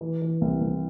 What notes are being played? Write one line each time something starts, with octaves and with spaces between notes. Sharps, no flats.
E3
E3
C2
C2